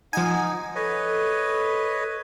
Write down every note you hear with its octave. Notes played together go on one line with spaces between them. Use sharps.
F3 D#4 F#5 G#5
A4 B4 C#5 D#5